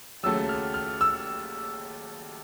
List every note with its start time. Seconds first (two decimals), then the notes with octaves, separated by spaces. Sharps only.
0.23 D#2 C#3 F#3 A3 E6
0.49 F6
0.74 F6
1.01 E6